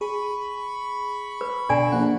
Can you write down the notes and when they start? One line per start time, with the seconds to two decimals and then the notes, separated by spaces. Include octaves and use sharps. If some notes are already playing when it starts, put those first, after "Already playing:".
0.01 G#4 B5 C#6
1.41 B4
1.69 B2 D3 A4 D5 G#5
1.92 A#1 F#5